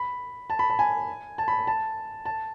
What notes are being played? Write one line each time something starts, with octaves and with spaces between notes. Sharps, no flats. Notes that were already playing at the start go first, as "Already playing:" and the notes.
Already playing: B5
A5
B5
A5
G#5
A5
B5
A5
A5